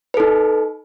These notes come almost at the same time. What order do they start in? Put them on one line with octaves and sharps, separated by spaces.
B4 A4 D#4